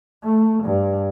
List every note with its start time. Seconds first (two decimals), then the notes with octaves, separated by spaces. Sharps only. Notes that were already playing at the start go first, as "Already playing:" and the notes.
0.23 A3
0.63 G2